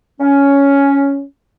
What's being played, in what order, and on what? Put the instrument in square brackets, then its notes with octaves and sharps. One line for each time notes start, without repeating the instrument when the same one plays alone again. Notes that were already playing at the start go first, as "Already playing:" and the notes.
[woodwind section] C#4